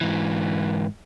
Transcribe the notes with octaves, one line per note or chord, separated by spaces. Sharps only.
G#2 E3